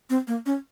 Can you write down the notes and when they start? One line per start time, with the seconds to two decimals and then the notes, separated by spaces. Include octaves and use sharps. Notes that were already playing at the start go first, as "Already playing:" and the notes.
0.10 C4
0.27 A#3
0.46 C#4